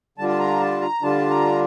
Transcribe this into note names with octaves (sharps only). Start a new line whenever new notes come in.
D3 G3 D4 F4 A5
A5
A#5
A5
A#5
D3 G3 D4 F4 A5
A#5